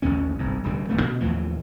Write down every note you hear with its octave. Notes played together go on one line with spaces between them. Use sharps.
A1 D#2 D3 C#4
G1 C2 G#2
D#1 D2 D3 G3
D#1 A1 A3 B3
B2
D#2 A2 E3 F3